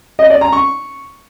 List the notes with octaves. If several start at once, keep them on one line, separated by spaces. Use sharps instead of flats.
D#5
D5
A#5
C#6